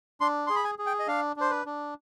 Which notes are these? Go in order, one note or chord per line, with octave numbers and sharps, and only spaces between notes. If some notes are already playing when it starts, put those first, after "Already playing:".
D4 C6
G#4 C6
B5
G#5
G#4
G5
D#5
D4 F5
D4 C5
B4
D4